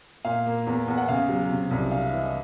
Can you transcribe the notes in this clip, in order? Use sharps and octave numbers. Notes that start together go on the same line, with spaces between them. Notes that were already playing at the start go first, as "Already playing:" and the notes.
A#2 F5
A#3
E2
E2
F#5
C#3 F5
F#3
C3
C2
D4 F5
E5
E3
D#5